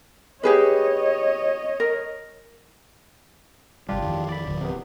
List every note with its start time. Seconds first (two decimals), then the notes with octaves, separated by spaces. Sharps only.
0.43 G4 G#4 B4 C#5 D#5
1.80 A#4
3.89 G1 C3 G3 D4 F4 G4
4.02 F2 D#3 E3
4.29 D5 B5
4.46 D1 D3 F3
4.61 C3 B3